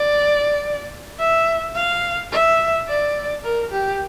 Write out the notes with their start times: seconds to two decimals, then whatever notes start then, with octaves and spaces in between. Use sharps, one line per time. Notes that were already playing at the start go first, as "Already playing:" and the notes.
Already playing: D5
1.19 E5
1.75 F5
2.32 E5
2.88 D5
3.44 A#4
3.71 G4